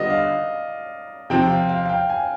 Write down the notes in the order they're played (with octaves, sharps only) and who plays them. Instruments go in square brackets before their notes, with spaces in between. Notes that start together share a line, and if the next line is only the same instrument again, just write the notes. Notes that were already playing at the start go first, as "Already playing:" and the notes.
Already playing: [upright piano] D3 G3 B3 F4 [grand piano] D5 D#5
[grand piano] F5
[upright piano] C3 F3 C4 [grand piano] G5
[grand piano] F5
F5
F5
G5
G#5